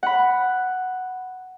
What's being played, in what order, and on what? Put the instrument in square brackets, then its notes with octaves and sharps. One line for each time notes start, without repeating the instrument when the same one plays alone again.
[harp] F#5 B5